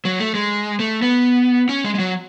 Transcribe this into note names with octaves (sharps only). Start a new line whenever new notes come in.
F#3
A3
G#3
A3
B3
C#4
G#3
G#3
F#3